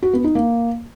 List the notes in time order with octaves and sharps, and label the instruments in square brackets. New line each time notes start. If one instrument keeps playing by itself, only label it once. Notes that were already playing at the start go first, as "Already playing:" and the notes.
[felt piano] F#4
B3
D#4
A#3